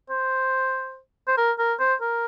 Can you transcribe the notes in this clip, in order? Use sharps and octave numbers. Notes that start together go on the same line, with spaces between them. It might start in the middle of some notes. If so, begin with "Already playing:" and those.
C5
C5
A#4
A#4
C5
A#4